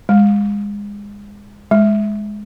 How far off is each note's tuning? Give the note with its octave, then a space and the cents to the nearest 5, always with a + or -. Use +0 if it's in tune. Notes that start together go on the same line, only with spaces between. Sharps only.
G#3 -25
G#3 +5